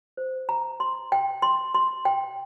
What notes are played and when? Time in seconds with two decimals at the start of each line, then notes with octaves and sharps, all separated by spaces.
0.17 C5
0.49 A#5
0.80 C6
1.12 G5
1.42 C6
1.75 C6
2.05 G5